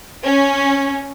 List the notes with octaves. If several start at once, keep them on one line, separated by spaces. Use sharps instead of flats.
C#4